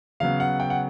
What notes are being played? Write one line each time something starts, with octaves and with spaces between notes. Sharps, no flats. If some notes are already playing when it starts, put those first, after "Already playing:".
C#3 F#3 B3 F5
F#5
G5
F#5